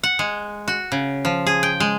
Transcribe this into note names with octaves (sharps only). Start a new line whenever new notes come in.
F#5
G#3
F#4
C#3
F3
G#4
G5
G#3